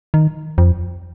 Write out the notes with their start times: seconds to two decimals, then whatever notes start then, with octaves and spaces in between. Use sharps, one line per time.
0.14 D#3
0.58 F2